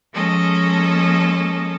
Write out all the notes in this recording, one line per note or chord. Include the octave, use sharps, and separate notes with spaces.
F3 G#3 A#3 C#4 A4 D#5